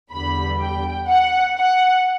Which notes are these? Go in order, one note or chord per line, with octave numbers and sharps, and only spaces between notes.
E2 D3 G3 B5
G5
F#5
F#5